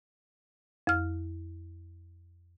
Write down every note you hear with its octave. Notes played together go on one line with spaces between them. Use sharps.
F2 F6